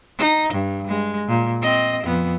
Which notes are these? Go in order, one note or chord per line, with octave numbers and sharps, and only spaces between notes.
D#4
G2
G#3
A#2
C4 D#5
F2 B3